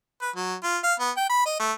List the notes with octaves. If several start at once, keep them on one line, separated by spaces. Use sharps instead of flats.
B4
F#3
F4
F5
B3
G5
B5
D#5
A3